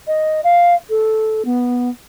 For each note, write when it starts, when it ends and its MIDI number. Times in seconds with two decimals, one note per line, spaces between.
0.07 0.40 75
0.44 0.74 77
0.89 1.42 69
1.45 1.89 59